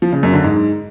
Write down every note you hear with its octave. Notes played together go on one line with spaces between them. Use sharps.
F3
C#3
F#2
D3
G#2